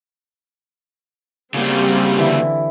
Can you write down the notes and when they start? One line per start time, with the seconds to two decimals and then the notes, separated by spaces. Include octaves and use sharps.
1.54 C#3 G3 A#3 C4
2.17 D3 E3 E4